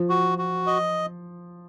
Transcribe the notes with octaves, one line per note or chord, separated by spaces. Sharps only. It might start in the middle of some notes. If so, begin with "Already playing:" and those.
Already playing: F3
F#4
F#4
D#5